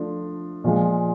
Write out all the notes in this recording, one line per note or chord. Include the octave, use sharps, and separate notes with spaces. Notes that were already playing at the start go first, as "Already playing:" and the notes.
Already playing: F3 A3 D4
A#2 F3 G#3